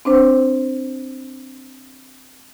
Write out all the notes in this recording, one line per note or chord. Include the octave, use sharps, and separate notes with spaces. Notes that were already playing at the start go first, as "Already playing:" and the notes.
C4 D4 C5